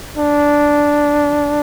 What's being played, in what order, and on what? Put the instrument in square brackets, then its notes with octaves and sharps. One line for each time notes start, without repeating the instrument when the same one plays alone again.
[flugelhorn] D4